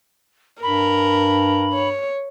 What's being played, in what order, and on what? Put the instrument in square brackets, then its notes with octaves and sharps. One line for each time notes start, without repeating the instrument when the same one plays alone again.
[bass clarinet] G2 [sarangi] A#4 [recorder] B5
[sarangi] C#5